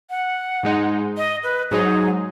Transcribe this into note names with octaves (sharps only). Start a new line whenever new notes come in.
F#5
G#2 G#3 D#4
D#5
B4
G#2 F#3 D#4 G#4